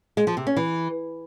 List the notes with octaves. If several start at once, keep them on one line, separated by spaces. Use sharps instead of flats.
G#3
F3
C3
C#4
E3